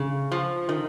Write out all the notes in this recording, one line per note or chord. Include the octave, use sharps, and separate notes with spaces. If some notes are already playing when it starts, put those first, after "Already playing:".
Already playing: C#3
F3
D#3